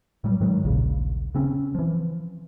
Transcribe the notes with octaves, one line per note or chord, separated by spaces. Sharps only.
A2 F#3 G3
G#2 D#3 F#3 G#3
D#1 A#1 A#2 C#3
C#3 C4 C#4
E3 F3